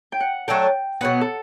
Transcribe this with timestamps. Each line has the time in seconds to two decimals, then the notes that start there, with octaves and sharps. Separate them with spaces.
0.12 G5
0.20 F#5
0.48 F#3 A3 D4 A4 G5
1.01 B2 F#3 B3 F#5
1.21 A4